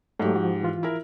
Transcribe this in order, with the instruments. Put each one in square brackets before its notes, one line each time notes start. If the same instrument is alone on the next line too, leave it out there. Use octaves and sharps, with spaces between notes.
[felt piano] G#2 G4 [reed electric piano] F#3 A3
[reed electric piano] F3 F#4
E3 F4
[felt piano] E4 A#4